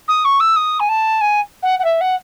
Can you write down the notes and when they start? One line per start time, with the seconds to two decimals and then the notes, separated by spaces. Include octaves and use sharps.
0.08 D#6
0.25 C#6
0.40 E6
0.56 D#6
0.80 G#5
0.89 A5
1.21 G#5
1.63 F#5
1.79 F#5
1.84 E5
2.01 F#5